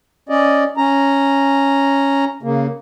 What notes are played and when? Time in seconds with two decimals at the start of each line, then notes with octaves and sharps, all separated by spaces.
0.29 C#4 D5 D#5
0.77 C#4 A#5
2.43 C#3 A#3